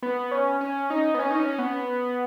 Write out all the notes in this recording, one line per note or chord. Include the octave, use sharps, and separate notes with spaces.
B3
C#4
C#4
D#4
B3
C#4
D#4
C#4
B3